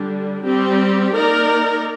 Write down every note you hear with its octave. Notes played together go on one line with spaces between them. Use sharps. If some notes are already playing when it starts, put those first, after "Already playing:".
Already playing: D3 G3 D4
G3 C4 G4
A#3 D#4 A#4 D5